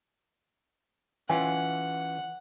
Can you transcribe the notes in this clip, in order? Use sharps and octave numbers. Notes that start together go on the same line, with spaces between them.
E3 C#4 F4 F#5 G#5